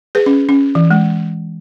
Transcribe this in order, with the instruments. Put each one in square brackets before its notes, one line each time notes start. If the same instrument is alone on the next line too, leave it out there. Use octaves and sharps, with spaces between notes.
[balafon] G#4 B4
C#4
C#4
E3
G#3